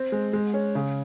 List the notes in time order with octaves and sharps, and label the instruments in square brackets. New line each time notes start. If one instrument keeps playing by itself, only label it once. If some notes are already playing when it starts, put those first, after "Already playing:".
Already playing: [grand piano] C4
G#3
G#3
C#4
C#3